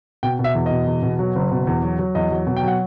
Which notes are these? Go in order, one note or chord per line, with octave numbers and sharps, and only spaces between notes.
B2 G5
B2
E5
E2
B2 D#5
E2
B2
F#3
F#1
B2
E2
F#3
F#3
E2 D#5
F#3
B2
G5
F#3 F#5